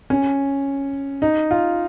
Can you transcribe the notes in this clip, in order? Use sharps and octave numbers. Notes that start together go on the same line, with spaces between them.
C#4
D#4
F4